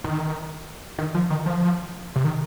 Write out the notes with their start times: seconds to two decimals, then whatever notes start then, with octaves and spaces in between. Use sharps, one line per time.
0.04 D#3
0.99 D#3
1.15 F3
1.30 D#3
1.46 F3
2.16 C3
2.24 D#3